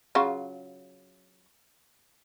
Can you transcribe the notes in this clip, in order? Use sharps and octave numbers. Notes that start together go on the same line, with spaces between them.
C#3 F#3 F4